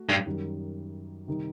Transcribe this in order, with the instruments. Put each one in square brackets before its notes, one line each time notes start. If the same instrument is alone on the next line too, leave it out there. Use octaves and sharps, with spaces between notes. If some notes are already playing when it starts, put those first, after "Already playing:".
Already playing: [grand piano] A3 F#4
[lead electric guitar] G2
[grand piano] F#2 D#3 G3
C3 D#3 G3 C4 D#4